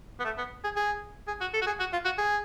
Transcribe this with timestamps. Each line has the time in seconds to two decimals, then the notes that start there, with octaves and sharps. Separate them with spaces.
0.20 B3
0.25 A3
0.38 B3
0.64 G#4
0.76 G#4
1.28 G#4
1.41 F#4
1.54 A4
1.62 F#4
1.67 G#4
1.80 F#4
1.93 F4
2.05 F#4
2.18 G#4